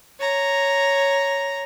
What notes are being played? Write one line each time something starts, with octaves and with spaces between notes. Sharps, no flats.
C#5 A#5